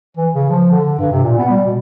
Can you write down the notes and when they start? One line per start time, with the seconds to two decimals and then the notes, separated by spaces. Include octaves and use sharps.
0.17 E3
0.35 C#3
0.50 F3
0.71 D3
0.98 G2
1.12 C3
1.23 A#2
1.38 B3
1.50 G3
1.65 B2